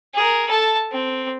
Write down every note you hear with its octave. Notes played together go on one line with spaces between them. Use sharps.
G#4 A#4
A4 A5
C4